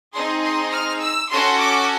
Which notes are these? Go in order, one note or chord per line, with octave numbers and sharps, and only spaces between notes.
C4 D#4 G#4 C6
C6
F6
E6
C#4 F#4 A4 C6
D6